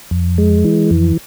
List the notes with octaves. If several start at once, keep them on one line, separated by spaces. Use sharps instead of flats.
F2
G#3
E3
F2